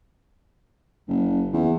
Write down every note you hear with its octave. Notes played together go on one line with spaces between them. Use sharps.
F#1
E2